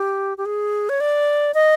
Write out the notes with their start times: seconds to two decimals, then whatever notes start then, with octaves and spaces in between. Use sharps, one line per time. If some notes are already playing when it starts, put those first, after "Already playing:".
Already playing: G4
0.38 G4
0.45 G#4
0.89 C#5
1.00 D5
1.54 D#5